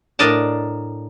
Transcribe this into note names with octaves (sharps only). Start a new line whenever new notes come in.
A2 D4 A#4 D5 D#5 A5